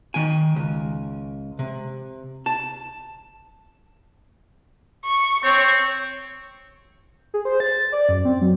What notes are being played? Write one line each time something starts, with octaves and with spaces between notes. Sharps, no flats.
D#3 G5 G#5
C#2
C3
A5
C#6
C4 C#5
G#4
C5
A6
D5
F#2
C4
F#3